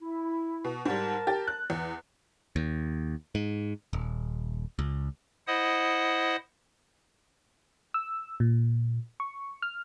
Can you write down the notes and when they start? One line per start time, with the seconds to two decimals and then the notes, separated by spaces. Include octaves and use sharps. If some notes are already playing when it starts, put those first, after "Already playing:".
0.01 E4
0.65 B2
0.85 G#2 G3 A#4 A5
1.27 G4 A6
1.47 F#6
1.70 E2
2.56 D#2
3.35 G#2
3.93 D#1
4.79 C#2
5.47 E4 C5 D#5 F#5 D#6
7.94 E6
8.40 A#2
9.20 C#6
9.62 F6